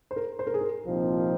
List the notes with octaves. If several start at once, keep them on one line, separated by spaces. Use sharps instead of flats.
C5
A#4
C5
A#4
G#4
A#4
C2 A#2 F3 C4 D#4